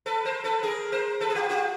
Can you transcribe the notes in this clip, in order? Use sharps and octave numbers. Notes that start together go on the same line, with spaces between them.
A4 B4
A#4 C5
A4 B4
G#4 A#4
A#4 C5
A4 B4
G#4
F4 G4
F4 G4